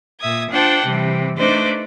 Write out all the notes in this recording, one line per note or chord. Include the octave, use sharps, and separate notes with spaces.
A#2 E5 D#6 G#6
D4 F4 C5 F#5 G5 A5
C3 E3 G3
A3 D4 D#4 B4 C5 D5